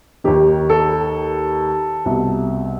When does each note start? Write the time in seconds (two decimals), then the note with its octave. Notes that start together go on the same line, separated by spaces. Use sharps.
0.24 D#2 D#3 G4
0.70 A4
2.05 C2 B2